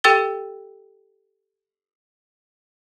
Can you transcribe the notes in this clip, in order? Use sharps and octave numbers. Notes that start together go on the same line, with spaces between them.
G4 A4 G5 E6 A6 G7